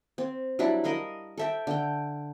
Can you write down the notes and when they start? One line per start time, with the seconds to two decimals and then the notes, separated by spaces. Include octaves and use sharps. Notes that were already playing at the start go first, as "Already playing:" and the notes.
0.18 C4
0.59 F#3 G3 D4 E4
0.84 A#4 D#5 F5 B5
1.38 A4 E5 G5
1.67 D3 G5